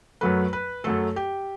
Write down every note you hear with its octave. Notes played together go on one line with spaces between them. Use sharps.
F#2 F#3 A3 B4
B4
F#2 F#3 A3 A4
G4